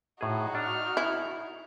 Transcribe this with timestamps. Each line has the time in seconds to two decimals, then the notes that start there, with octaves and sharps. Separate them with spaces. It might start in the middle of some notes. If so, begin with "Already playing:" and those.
0.21 A2 D#4 F#4 G#4
0.55 D4 F6
0.97 E4